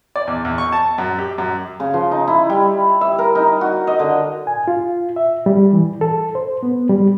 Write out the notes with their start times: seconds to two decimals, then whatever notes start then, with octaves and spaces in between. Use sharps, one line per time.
0.16 D5
0.27 E2
0.45 E2
0.58 C#6
0.72 A5
0.98 F#2
1.19 G4
1.38 F#2
1.80 C#3
1.94 F3
2.11 D#4
2.28 E4
2.50 G3
3.01 E5
3.19 A#4
3.35 D#4
3.61 F#4
3.87 D#5
3.99 D3
4.47 G#5
4.68 F4
5.16 E5
5.46 G3
5.73 E3
6.01 A4
6.35 C5
6.63 B3
6.89 G3